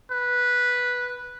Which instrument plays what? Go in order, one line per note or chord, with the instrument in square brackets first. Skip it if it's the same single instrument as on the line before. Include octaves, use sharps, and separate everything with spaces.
[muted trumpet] B4